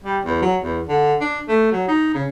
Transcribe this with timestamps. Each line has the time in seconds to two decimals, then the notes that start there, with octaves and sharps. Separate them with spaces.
0.04 G3
0.25 E2
0.42 F#3
0.62 E2
0.89 D3
1.21 D4
1.48 A3
1.72 F#3
1.88 D#4
2.15 C#3